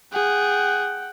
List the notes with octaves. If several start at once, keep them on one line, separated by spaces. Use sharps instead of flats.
G#4 F#5 G5